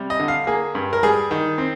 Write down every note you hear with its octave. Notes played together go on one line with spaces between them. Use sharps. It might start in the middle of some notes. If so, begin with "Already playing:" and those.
Already playing: C3 G3
D#5
D3
F5
A#3 G#4
G2
A#4
G3 G#4
D#3
C4